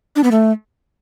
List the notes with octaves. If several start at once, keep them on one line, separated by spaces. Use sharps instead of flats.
D4
B3
A3